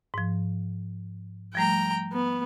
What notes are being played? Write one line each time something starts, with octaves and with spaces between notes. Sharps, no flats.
G#2 F3
F3 G3 A3 G5 A#5
B3